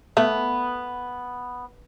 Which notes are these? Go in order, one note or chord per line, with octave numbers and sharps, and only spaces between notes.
A3 B3